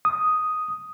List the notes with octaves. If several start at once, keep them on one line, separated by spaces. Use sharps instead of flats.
D#6